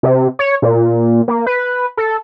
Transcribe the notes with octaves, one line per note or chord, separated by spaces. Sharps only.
C3
C#5
A#2
A#3
B4
A4